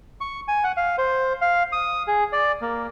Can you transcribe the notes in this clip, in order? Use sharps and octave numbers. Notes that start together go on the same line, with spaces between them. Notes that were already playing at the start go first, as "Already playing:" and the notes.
C#6
G#5
F#5
F5
C5
F5
D#6
G#4
D5
A#3